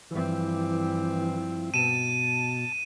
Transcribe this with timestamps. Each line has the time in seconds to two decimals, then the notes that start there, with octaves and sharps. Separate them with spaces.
0.11 G2 E3 F3 C4 E4
1.74 B2 A5 D#7 E7